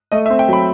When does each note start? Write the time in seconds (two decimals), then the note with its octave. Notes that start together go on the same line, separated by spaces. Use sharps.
0.12 A3 D#5
0.26 E5
0.30 C4
0.39 G5
0.48 F#3 B5